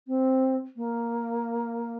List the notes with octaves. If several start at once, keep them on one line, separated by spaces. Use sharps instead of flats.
C4
A#3